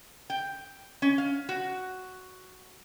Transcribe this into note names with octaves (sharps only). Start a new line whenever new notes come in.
G5
C#4
F5
F#4